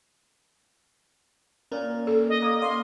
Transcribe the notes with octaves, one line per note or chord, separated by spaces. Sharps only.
A#2 C#4 A#4
A4
D#5
A#3 D#6
D5 F5 C6